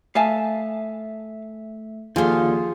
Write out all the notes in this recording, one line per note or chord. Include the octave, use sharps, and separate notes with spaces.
A3 E5 F5 G#5 A5
D#2 D3 F3 F4 G#4 C5